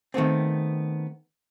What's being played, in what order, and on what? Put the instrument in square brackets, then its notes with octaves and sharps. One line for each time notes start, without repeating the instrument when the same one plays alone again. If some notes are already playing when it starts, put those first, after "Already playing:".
[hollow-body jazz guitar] D#3 A3 B3 C4